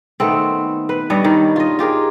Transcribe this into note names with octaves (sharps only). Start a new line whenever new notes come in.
D#3 A3 B3 C4
B4
G2 G3 C#5 D#5
D#3
F4 D#5
F4 G4 G#4 A#4